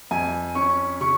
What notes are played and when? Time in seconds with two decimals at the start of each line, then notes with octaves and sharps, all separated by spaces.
0.11 F2 G#5
0.55 C#4 C#6
1.01 C#3 C#6